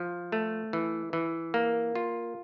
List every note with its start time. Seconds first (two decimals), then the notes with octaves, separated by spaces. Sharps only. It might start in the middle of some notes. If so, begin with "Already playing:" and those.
Already playing: F3
0.32 A3
0.73 E3
1.13 E3
1.54 A#3
1.95 F4